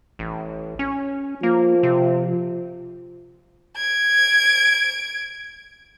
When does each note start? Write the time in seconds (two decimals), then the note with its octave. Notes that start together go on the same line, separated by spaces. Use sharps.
0.19 A1
0.79 C#4
1.43 F3 A#3
1.83 C3
3.77 G#6 D7